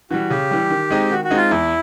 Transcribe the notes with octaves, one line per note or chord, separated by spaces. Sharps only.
E3 G3 F#4
C#3 G4
E3 G3
D#3
G#3 C4 D#4
D#3 F#4
F#4
G#3 C4 D#4
F4
E2 E4